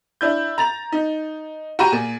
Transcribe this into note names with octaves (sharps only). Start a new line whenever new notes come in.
D4 E4 G6
A#5 A6 F7
D#4
F#4 G4 A#5 D#7
A#2 G#4